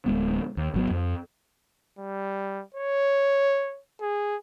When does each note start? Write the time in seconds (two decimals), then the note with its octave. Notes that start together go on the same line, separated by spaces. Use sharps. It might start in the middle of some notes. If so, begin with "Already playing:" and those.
0.06 D1 G#3 B3
0.57 D#2
0.74 G#1 F#3 B3
0.91 F2
1.99 G3
2.75 C#5
4.01 G#4